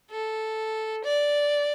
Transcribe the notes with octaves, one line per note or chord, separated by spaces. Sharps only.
A4
D5